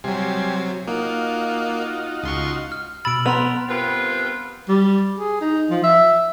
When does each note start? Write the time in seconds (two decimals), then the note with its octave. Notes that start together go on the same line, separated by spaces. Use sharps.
0.04 C3 F#3 G3 G#5 C6
0.88 A#3 D#4 F4 F#4
2.23 C#2 C6 C#6
2.72 F6
3.05 B2 B5 E6 A6 D7
3.26 B3 A#5 C6 F7
3.69 G2 B3 C4 F4 A#4 B4
4.68 G3
5.19 G#4
5.41 D#4
5.70 F3
5.83 E5